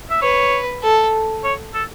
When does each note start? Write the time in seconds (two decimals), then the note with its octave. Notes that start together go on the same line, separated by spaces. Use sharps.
0.11 E5
0.22 B4 C#5
0.83 A4
1.44 C#5
1.74 A4